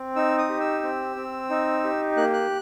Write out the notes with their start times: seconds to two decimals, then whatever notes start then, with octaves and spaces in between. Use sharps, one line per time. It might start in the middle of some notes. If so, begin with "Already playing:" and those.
Already playing: C4
0.16 D#4 E6
0.38 D#6
0.49 G4
0.60 E6
0.83 C4
1.16 C4
1.50 D#4
1.84 G4
2.17 A#3 F#6
2.34 F#6